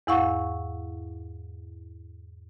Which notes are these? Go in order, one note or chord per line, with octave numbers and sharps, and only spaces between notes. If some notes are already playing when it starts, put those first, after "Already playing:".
E2 G#2 E4 F5 F#5 C#6